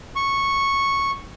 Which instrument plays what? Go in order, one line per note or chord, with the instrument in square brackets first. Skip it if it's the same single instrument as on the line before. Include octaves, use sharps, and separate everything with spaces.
[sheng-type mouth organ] C#6